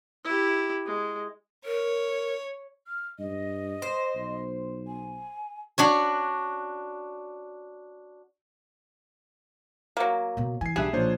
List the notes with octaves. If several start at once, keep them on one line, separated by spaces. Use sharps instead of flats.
E4 G4
G#3
A#4 C#5
F6
G2 D#5
C5
B1
G#5
D4 F#4 C#5
F#3 A#3
B2 B3
E3 G#5 C7
B1 G3 D4 G#4 E5 F#6 E7
A#2 F3 D4 C5 C#5